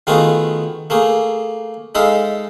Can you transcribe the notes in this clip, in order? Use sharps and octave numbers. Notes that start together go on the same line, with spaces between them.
D#3 A3 B3 F4 F#4 G#4
A3 A#3 G#4
G#3 D#4 A4 E5 F5